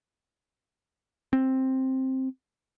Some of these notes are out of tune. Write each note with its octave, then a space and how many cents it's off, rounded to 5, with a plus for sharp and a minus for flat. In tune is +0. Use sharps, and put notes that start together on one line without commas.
C4 +5